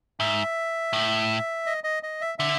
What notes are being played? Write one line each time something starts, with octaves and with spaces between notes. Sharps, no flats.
G#2 E5
A2
D#5
D#5
D#5
E5
D3 E5